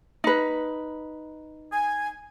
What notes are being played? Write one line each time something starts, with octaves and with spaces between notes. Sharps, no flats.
D#4 B4
G#5